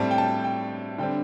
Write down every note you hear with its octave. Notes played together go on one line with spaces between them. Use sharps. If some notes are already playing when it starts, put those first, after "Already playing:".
Already playing: A2 G3 C4 A5
G5
A5
G5
D3 G3 C4 G5